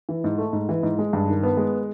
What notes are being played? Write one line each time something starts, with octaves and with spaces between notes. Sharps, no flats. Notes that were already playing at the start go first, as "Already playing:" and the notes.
E3
G#2
A3
G#2
E3
G#2
G#3
G2
D#3
B3
G#3